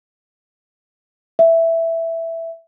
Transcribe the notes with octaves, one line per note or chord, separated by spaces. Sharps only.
E5